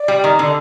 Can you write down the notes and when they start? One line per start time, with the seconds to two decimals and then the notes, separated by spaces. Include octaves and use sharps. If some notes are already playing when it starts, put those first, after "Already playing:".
Already playing: D5
0.08 G3
0.24 D#3
0.39 D3